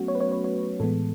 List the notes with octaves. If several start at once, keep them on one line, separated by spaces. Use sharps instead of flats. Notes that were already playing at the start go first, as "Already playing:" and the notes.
Already playing: F#3 A3 B3 C#4 F#4
C#5
B4
C#5
C#5
C#5
A2 E3 G#3 B3 A4